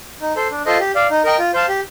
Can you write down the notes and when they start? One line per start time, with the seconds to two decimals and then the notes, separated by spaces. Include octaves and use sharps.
0.21 D#4
0.36 A4 C5
0.50 D4
0.66 F4 A4 C5 D#5
0.80 G4
0.95 D5 F5
1.10 D#4
1.24 A#4 D#5 G5
1.39 F4
1.54 C5 F5 A5
1.69 G4